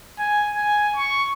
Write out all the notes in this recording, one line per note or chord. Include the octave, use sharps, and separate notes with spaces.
G#5
G#5
C#6